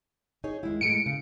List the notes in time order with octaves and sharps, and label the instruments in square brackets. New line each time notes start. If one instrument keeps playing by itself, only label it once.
[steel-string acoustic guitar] D#4 G#4 C#5
D#2 G#3 E4
[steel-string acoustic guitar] A2 G#3 [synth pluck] C#7 D7
[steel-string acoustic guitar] C#3